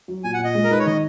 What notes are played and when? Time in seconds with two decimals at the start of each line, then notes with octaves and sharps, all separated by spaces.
0.08 F#3
0.24 A#2 G#5
0.34 F#5
0.39 A#2
0.44 D#5
0.55 G#3
0.64 A#4
0.71 D#4 B4
0.79 C#5
0.86 D#3 D#5